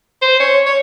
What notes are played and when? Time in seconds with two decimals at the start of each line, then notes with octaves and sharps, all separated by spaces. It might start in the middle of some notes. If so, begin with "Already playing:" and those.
0.22 C5
0.40 C#5
0.66 C#5